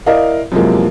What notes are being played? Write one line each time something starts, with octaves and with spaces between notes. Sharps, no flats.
E4 A#4 D5 D#5 F5
F#2 C3 E3 F3 G#3 A#3